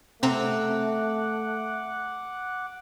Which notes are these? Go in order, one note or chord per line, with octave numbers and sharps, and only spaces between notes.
C3 A3 C4 F#5 A#5 D6 F#6